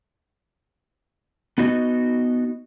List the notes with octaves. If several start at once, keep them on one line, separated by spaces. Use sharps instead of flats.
B3 D#4 F#4 D#5